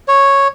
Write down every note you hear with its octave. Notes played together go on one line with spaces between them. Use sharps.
C#5